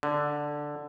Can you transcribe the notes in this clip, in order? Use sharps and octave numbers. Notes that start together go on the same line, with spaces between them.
D3